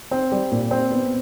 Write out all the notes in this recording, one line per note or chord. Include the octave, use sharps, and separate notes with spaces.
C4
G3
A#2
C4
B3